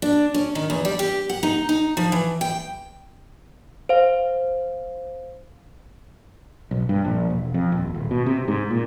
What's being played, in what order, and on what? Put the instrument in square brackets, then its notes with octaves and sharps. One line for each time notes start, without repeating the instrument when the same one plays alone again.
[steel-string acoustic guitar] D4
C#4
D#3
E2
G3
G4
F#5
D#4
D#4
F3
E3
G5
[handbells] C5 F5
[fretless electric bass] B1
G2
A#1
E1
F2
D#1
D#1
B2
C3
G#2
A#2